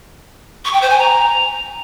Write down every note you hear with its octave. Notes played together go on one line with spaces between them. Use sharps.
C#6
G5
C5
G#5
A#5